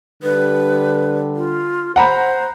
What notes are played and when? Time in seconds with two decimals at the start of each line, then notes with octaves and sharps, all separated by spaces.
0.23 D3 G3 B4
1.35 F4
1.96 C5 F#5 A#5 B5